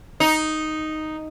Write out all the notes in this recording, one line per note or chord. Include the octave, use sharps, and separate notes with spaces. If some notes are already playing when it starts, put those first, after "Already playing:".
D#4